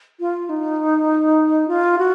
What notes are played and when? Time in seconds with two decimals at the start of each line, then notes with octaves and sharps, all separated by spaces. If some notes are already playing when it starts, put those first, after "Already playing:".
0.20 F4
0.49 D#4
1.68 F4
1.98 F#4